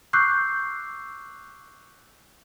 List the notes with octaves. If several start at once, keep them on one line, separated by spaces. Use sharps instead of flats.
C#6 D6 E6 F#6 G6 C7